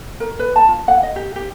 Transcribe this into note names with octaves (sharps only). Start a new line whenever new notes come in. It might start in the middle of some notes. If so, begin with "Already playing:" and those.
A#4
B4
A5
F4
F#5
D#5
G4
G4